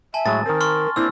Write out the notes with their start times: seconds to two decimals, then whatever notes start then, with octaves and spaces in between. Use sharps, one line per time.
0.14 E5 G#5 A5
0.26 A2 F#3 G#3 A6
0.46 D#3 C4 A#4
0.60 C6 C#6 F6
0.96 A#3 C4 D4 E4 E6